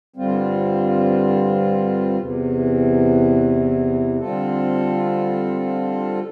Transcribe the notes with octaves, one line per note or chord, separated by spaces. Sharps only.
G2 D3 G3 C4 F4
E2 C3 E3
D3 G3 C4 F4 A4